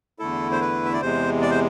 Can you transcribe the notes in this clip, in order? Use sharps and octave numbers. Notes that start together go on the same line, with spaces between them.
E2 D3 A3 E4 A4
C5
B4
E5
D5
E2 C3 G#3 C5
D5
C5